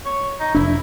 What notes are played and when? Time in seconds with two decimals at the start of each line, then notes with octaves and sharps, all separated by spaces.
0.05 C#5
0.40 D#4
0.55 F1 D4 E4